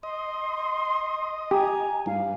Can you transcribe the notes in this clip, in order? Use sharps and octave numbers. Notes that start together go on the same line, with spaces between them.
D#5 C6
G4 G#5 A#5
G2 F5